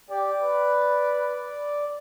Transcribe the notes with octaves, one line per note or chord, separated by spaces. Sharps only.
G4 D5
B4